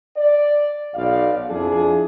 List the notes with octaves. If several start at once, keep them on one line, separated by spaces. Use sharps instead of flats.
D5
B1 D5 F5
F2 D4 E4 G#4